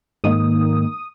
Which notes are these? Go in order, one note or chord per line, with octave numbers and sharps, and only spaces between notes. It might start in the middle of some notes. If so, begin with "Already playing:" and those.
G#2 D#3 A#3 D#6